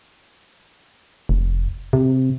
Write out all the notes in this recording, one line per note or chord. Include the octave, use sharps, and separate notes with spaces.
F1
C3